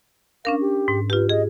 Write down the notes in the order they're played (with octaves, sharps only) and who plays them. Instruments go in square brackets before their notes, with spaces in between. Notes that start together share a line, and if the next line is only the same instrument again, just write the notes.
[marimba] C#4 D4 A#4 [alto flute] F5
[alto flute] G4
[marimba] G#2
[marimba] F4 G4 [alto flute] B4
[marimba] G#4 [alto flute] D#5